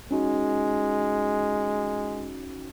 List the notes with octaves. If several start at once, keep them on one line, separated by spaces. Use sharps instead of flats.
G#3 C#4 D#4 F#4